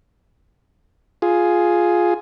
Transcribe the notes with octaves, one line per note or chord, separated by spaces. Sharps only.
F4 G#4